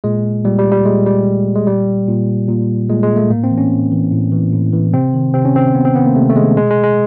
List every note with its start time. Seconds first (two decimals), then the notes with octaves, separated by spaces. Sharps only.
0.04 A#2 G#3
0.45 A#2 G3
0.58 G3
0.72 G3
0.85 A#2 G#3
1.06 G3
1.26 A#2
1.55 G#3
1.67 A#2 G3
2.08 A#2
2.49 A#2
2.89 A#2 G#3
3.03 G#3
3.16 A3
3.30 A2 A#3
3.44 C4
3.51 E3
3.58 C#4
3.71 A2
3.92 E3
4.12 A2
4.32 E3
4.53 A2
4.73 E3
4.93 C3 C4
5.14 D#3
5.34 C3 C4
5.45 C#4
5.55 D#3 C4
5.75 C3 B3
5.85 C4
5.95 D#3 B3
6.05 A#3
6.16 C3 A3
6.29 A3
6.36 D#3 G#3
6.57 B2 G#3
6.70 G#3
6.83 G#3